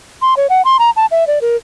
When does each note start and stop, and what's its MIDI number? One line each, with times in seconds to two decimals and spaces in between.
0.22 0.34 84
0.37 0.47 73
0.50 0.62 78
0.65 0.77 84
0.79 0.90 82
0.96 1.06 81
1.11 1.26 76
1.27 1.39 74
1.41 1.56 70